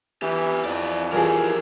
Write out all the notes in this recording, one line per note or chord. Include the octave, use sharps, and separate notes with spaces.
E3 B3 G4
F2 E4 D5
E3 F3 G4 G#4 A#4